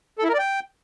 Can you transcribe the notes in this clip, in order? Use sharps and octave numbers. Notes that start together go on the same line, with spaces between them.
A4
E4
A#4
D5
G5